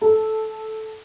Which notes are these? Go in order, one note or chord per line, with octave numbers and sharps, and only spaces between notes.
A4